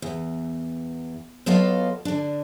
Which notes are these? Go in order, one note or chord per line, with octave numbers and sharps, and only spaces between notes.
E2
F#3 B3 F4 A4 D#5 F5
D3 D4